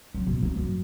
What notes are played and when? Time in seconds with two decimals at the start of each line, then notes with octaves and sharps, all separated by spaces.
0.14 F#3
0.27 B2
0.43 D#3
0.56 F#2